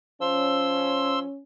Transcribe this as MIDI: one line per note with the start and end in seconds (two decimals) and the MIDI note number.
0.21 1.22 53
0.21 1.41 61
0.21 1.19 84
0.21 1.19 88